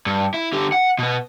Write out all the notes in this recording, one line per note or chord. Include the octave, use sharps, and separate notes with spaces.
G2
E4
D3 G4
F#5
B2 B3